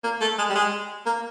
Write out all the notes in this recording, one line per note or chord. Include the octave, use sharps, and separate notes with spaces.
A#3
A3
G#3
G3
G#3
A#3